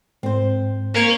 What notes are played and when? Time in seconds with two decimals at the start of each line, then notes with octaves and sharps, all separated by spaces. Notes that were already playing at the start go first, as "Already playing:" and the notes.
0.23 G#2 C4 C5
0.95 A#3 C#4